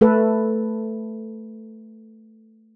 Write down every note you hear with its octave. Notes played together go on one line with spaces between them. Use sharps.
A3 A4 B4